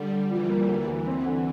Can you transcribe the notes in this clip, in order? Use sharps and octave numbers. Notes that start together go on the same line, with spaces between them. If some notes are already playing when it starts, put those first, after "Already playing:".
Already playing: D3 G3
D3
E3 F3
A#3
D2 E3
D2
C4
D3